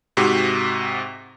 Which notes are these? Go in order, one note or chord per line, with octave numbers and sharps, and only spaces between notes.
G#2 C3 F#4 G4